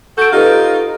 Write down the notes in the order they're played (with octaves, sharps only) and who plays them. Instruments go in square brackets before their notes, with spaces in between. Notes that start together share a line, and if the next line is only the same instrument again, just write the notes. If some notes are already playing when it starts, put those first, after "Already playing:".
[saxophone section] F#4 A4 [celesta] G6 D7
[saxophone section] D#4 F4 [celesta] G4 A4 B4